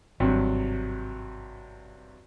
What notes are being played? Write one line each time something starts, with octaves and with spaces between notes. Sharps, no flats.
G#1 G2 C3 F#3